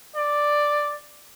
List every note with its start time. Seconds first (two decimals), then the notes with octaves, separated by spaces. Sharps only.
0.16 D5